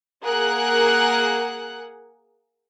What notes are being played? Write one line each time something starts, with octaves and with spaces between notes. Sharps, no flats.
A#3 G#4 A#4 F#5 F#6